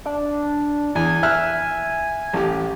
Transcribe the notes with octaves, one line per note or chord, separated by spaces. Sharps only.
D4
E2 G#5
E5 F6 F#6
A1 G4